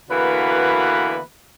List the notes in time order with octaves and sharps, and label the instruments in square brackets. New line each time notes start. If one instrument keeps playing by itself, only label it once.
[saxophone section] D3 E3 A#3 B3 F#4 B4